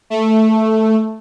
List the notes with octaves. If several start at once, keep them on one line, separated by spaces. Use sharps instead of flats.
A3